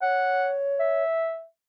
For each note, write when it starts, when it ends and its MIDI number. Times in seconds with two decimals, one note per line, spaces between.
0.02 1.04 73
0.02 0.50 78
0.80 1.44 76